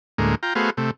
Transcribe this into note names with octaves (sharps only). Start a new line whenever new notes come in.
D2 A2 G#3 A#3
F4 G5 A#5
A3 B3 F#4 G#4 C5 F5
C3 A3